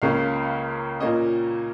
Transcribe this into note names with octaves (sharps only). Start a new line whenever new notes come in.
C#2 C#3 A#3 C#4 F5
A#2 A#3 C#4 D#5